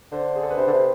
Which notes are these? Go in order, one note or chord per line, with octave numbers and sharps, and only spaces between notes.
D3 C5
G#4
A4
B4
C3 C5
D3
C3